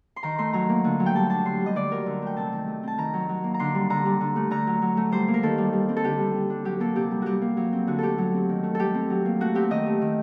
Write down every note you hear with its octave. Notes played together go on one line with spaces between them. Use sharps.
C6
D#3 A#5
A3 C6
F#3 A#5
A#3
D3
F#3
G5
G3 A5
D4 A5
D3 C6
G3
D#5
D3 D5
F#3 A#4
D3
A3 G5
C3 A5
D#3
A3
C4 A5
D#3 A#5
F#3
F#3
A#3
A#5
D3 C6
G3
D3 A#5
G3
D3
A3
D3 A#5
F#3
F#3
A3
G3 C5
A#3
A#4
D#3 A4
G3
G3
C4
A4
D3 G4
G3
G3
D4
F#3 G4
A#3 A4
C3 G4
G3
G3 F#4 G4
A#3
F#3
C4
D3 F#4
A3 G4 A4
F#3
C4
D#3
A3
G3 G4 A4
C4
F#3
A#3
A3 F#4
C4 G4
D#3 D#5
A3
D#3